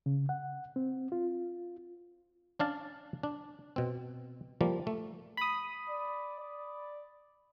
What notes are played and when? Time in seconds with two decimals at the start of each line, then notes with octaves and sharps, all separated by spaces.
0.06 C#3
0.29 F#5
0.76 C4
1.12 F4
2.59 C#4 D4 F5 A5
3.23 D4
3.76 B2 C4
4.61 F3 G3 A#3
4.87 A3
5.37 B5 D#6
5.89 D5
6.39 D5